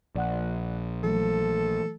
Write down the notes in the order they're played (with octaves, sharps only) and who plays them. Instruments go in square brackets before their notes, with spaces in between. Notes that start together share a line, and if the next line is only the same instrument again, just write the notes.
[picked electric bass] A#1 [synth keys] D5 F#5 F#6
[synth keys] E3 F#3 A3 [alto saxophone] A4